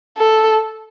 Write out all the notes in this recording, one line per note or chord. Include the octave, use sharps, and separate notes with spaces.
A4